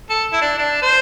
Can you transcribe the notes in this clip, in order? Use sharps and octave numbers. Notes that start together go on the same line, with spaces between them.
A4
E4
D4
D4
C5